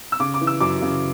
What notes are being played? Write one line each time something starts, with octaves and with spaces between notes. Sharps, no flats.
E6
C#3 D6
D6
E3
E6
F#2 D6
C#3